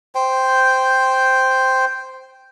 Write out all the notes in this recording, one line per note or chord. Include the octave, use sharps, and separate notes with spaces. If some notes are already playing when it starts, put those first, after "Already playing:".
C5 G5